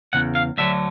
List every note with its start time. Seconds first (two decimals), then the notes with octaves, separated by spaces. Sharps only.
0.13 E2 C#3 F#5
0.35 F5
0.58 D2 D3 F#3 E5